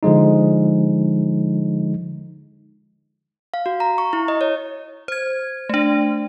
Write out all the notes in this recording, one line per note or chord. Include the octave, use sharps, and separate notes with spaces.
D3 F3 G#3 D#4
F5
F#4
A#5
C#6
E4
D#5
C#5
C5 G#6
A3 D4